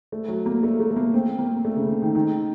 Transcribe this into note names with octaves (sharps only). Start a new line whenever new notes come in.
A3
F#3
A#3
A3
A3
A3
A#3
C4
A#3
A3
C#3
C#3
D#3
D#3